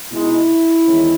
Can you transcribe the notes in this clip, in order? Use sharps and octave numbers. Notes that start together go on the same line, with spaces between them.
B2 G#3 D#4 E4
E2 D#3 G#3 C#4